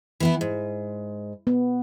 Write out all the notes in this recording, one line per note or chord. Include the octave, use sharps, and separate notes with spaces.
E3 B3 E4
G#2
B3